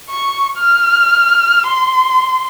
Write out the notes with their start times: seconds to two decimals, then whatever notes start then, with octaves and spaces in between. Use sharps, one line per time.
0.10 C#6
0.58 F6
1.66 C6